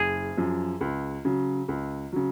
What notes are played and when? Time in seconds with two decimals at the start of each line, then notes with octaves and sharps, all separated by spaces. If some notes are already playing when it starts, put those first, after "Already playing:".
Already playing: F#1 G#4
0.37 F#2 F3
0.81 C#2
1.25 C#3 F#3
1.68 C#2
2.13 C#3 F#3